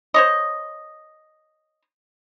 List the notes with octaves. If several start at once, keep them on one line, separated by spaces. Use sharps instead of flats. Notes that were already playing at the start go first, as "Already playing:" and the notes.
C5 C#5 D#5